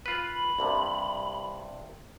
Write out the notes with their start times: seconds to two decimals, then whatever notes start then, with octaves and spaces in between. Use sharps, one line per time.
0.06 F4 B4 B5
0.59 C2 G2 C3